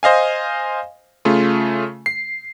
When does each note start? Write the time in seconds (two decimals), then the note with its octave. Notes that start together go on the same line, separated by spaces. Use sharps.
0.03 C5 D#5 F5 G#5
1.25 C#3 A3 F4
2.06 C7